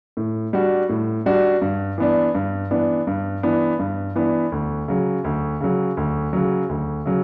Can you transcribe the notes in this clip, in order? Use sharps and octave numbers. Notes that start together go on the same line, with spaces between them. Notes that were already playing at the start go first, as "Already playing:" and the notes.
A2
G3 D4 F#4
A2
G3 D4 F#4
G2
E3 B3 D4
G2
E3 B3 D4
G2
E3 B3 D4
G2
E3 B3 D4
D2
C#3 F#3
D2
C#3 F#3
D2
C#3 F#3
D2
C#3 F#3